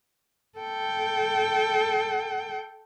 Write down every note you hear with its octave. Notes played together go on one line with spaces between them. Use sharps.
A4 G5